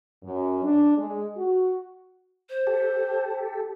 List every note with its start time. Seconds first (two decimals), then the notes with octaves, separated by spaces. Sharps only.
0.24 F#2
0.64 D4
0.98 G#3
1.37 F#4
2.50 C5
2.67 G4 A4